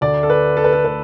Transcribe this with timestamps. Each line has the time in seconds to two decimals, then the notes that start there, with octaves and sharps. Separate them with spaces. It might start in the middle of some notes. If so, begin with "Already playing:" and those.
0.01 D2 D3 A3 D5
0.23 A4
0.30 B4
0.57 A4
0.64 B4
0.73 A4
0.85 D3 A3 B4